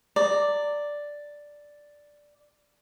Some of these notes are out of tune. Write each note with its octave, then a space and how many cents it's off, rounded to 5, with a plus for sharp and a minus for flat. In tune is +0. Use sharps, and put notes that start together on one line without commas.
D5 +0 A#5 -30